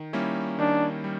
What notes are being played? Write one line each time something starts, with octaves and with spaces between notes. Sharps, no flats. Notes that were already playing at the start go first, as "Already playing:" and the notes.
Already playing: D#3
G3 A#3 C#4 E4
D#3 D4
G3